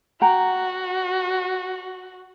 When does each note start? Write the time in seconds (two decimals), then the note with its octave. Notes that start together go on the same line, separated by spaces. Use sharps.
0.22 F#4 F#5 G5 A#5